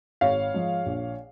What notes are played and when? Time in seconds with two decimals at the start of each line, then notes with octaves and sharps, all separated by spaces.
0.21 G#1 C#5 F5
0.54 G#2 F3 G#3
0.86 A#1